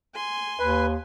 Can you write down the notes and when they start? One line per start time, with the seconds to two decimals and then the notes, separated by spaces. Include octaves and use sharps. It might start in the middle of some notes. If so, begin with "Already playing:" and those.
0.15 G#5 C6
0.59 D#2 B4